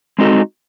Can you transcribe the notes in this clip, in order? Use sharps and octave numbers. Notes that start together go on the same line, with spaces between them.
G#3 C4 D#4 F#4 A4